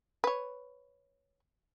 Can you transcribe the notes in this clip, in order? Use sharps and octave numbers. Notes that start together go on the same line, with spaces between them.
B4 C#5